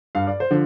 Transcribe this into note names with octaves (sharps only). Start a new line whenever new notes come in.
G2 F5
D5
C5
D3 F3